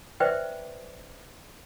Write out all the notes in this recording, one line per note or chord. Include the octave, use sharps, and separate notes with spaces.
B4 C5 D5 E5 G5